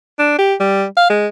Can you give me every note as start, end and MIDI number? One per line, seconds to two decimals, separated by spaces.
0.19 0.38 62
0.39 0.54 67
0.60 0.85 55
0.97 1.09 77
1.10 1.27 56